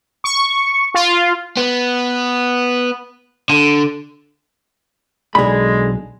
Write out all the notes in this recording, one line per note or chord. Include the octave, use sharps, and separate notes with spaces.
C#6
F4
B3
D3
B1 D3 G#3 G#4 B5